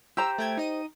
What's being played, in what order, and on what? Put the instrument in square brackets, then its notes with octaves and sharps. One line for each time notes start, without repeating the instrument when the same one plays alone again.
[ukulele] G4 C5 A#5 [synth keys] E6
[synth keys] A3 G5 G#6
D#4 D#5 D#7